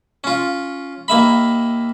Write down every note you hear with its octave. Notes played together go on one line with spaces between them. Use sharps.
C#4 F4
D#2 A#3 E5 B5